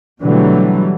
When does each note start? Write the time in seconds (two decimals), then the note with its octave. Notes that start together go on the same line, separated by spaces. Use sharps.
0.21 B2 D3 E3 F#3 G3 A3